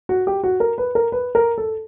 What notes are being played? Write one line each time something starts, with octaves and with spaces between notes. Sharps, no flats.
F#4
G4
F#4
A#4
B4
A#4
B4
A#4
A4